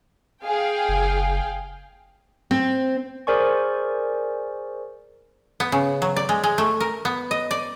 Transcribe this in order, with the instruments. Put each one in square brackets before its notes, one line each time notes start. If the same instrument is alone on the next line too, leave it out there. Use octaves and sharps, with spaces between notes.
[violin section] G#4 F5 G5
[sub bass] F#1
[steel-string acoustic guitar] C4
[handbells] G#4 A#4 C5 D5 G#5 C#6
[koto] B3
C#3
F#3
D5
G#3
G#3
A3
A#4
B3
D#5
D5